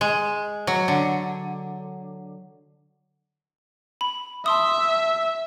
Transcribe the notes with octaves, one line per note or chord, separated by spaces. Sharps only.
G#3
F#3
D3
B5
E5 A5 C6 D#6